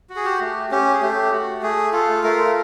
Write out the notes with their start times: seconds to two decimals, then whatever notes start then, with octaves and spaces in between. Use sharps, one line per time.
0.10 F#4
0.16 G#4
0.25 G4
0.41 A3
0.71 C#4 G4
0.94 G#4
1.02 A3 G4
1.32 F#4
1.62 A3 G#4
1.92 F4 A4
2.23 A3 A#4